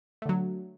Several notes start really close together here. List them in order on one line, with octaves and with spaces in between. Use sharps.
A3 D3 F#3